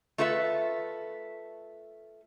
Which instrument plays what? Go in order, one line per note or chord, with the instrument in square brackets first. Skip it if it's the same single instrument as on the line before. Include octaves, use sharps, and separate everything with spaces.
[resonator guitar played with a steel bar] A3 F4 A4 B4 E5